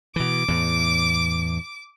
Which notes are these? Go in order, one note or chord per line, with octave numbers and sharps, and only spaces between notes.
B2 E3 D6
E2 A2